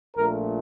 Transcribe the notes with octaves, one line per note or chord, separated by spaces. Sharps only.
A#1 A#2 A3 A#4